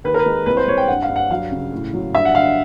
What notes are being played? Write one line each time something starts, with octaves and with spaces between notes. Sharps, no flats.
D#2 B4
A#4
B4
G#3
C2 B4
C5
C2 C#5
G5
G2 F#5
F5
G2
F#5
F#3 F5
C#3
A2
F#3
G2 E5
F#5
D3 F5